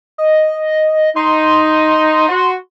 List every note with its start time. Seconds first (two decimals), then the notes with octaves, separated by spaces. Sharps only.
0.18 D#5
1.16 D#4 C6
2.28 F#4